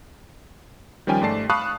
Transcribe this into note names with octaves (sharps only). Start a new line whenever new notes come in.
D#3 F3 G3 C#4 G5 G#5
G#2 A3 D5 A5 C7
F5 A5 B5 C#6 D#6 F#6